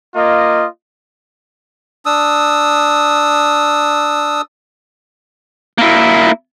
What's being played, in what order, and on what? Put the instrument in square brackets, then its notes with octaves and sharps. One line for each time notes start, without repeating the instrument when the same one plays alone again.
[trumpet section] A#3 F4 D#5
[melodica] D4 D#6 E6
[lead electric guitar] A#3 E4